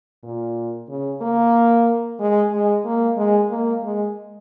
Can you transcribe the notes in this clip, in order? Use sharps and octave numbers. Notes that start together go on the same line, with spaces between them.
A#2
C#3
A#3
G#3
G#3
A#3
G#3
A#3
G#3